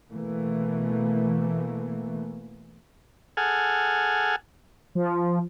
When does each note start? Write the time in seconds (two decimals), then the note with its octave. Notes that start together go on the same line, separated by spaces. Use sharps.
0.11 B2 E3 A3 A#3
3.37 G#4 A4 F#5 G#5 F6
4.95 F3